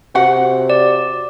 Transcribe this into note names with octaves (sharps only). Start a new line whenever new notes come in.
C3 F#4 F#5
D5